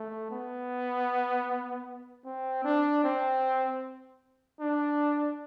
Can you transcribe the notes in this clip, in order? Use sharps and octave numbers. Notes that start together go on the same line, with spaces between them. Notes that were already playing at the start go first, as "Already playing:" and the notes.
Already playing: A3
B3
C4
D4
C4
D4